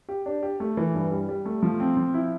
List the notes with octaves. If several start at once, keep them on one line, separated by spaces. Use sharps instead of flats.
G4
D4
G4
A3
E3
G2
G3
G3
A3
F3
C4
F3
E4